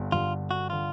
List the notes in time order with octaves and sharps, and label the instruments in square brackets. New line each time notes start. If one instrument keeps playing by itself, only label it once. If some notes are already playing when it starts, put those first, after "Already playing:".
Already playing: [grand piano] G1 G2 D3
[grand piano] G1 G2 D3 [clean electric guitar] F4
[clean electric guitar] F#4
[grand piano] D3 [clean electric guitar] F4